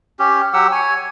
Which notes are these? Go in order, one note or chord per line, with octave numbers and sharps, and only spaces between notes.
C#4 G4
F#3 G4 F#5 E6
C#5 G#5